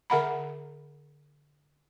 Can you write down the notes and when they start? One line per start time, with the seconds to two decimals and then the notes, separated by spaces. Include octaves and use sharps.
0.10 D3 A#4 E5 F#5 A#5 B5